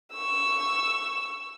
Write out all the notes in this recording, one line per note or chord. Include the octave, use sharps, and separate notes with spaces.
C#6 E6